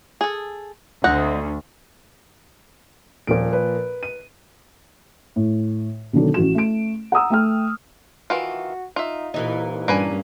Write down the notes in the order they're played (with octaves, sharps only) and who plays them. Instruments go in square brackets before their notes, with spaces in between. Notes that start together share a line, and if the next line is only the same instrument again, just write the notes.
[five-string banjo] G#4 A4
[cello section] D2 [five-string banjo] C4 D#5 F#5
[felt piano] D#1 [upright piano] A#2 F3 D7
[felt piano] A#4 B4
[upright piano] D#7
[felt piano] A2
B2 D3 D#3 F#3 D4 A4
A1 F#4 E7
A3 D7
F#5 A#5 D#6 E6
A3 G5 F6
[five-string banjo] D#3 E3 F4 [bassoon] F#4
[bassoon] D#4 [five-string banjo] F4 E5
[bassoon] C2 [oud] A#2 E3 D#4
[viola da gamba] G2 C#4 [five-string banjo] A#3 B4 G#5 [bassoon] D4